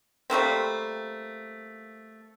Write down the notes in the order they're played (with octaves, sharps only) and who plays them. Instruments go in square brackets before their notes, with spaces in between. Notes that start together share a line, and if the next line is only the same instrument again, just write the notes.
[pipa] G3 A3 A#3 C4